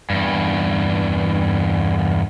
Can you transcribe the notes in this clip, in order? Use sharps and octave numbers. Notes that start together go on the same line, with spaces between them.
E2 G2